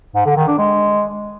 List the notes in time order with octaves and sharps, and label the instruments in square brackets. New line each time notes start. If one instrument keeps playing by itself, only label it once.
[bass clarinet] G#2
D3
D#3
D4
G#3